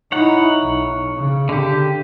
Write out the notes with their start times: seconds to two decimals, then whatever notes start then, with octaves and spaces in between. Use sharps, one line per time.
0.12 D#4 E4 C#5 F#5
0.60 B1
1.17 C#3
1.49 D3 G4